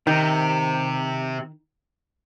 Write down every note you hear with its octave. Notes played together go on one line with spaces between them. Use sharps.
C3 D#3